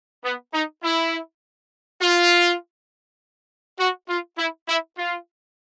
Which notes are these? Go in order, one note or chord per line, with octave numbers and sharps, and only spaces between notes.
B3
D#4
E4
F4
F#4
F4
E4
E4
F4